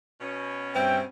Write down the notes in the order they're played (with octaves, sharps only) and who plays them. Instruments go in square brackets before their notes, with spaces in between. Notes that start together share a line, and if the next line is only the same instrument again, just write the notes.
[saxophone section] B2 C#4
[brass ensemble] G2 E5 G5 [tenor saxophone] C4